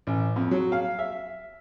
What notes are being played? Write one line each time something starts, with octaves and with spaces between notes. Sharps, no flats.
A1
F2
F#3
F5
E5